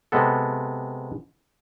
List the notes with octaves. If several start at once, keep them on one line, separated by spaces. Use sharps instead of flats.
C3 G#3 B3 A4